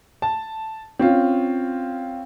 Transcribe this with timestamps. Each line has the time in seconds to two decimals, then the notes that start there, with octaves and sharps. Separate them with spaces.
0.22 A5
0.99 C4 C#4 F4